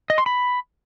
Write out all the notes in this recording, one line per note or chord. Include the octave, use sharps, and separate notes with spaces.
D#5
C6
B5